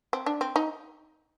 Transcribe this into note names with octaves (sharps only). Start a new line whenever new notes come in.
C4
D4
C4
D#4